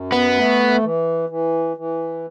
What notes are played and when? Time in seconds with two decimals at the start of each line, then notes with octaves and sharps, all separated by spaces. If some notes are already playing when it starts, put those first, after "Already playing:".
Already playing: F#2
0.12 B3
0.35 A3
0.82 E3
1.29 E3
1.77 E3